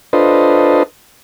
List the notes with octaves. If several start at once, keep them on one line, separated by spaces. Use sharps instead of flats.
D4 F4 A4 B4 C5 D#5